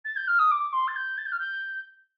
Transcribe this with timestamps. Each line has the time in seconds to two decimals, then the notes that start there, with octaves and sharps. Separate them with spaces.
0.04 A6
0.16 G6
0.27 F6
0.38 D#6
0.51 D6
0.72 C6
0.87 A6
0.95 G6
1.17 A6
1.25 G6
1.32 F6
1.39 G6